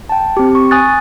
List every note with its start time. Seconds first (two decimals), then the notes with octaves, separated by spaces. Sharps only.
0.09 G5 A5
0.37 C4 G4
0.55 C#6
0.71 G#5 D#6 F#6 A6